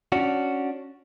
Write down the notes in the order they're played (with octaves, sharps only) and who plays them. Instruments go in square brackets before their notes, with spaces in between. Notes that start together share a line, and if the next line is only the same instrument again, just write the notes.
[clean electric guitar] C#4 D4 F#4